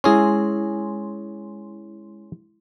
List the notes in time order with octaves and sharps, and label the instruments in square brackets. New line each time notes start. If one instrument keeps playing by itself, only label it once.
[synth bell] G#3 E4 C6 [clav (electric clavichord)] C#4 G#4